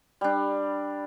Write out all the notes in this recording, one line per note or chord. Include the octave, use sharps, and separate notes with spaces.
G3 D4